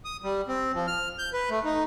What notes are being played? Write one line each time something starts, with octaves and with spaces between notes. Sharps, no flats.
D#6
G3
C4
F3
F6
G6
B4
A3
D#4